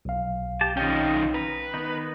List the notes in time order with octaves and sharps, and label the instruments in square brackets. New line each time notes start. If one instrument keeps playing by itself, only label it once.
[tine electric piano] B1 F5
[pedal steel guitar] G4 A5
[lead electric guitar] D#3 C#4 [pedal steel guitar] D#5 G5
[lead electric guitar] B4 [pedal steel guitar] A#5
[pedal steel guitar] D#3 B3 D#4